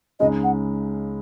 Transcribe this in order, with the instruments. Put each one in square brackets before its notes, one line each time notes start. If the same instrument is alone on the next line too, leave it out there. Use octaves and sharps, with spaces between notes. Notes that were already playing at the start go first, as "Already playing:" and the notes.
[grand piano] C#2 C#3 G#3 D#4 [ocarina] D#5
[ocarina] F#5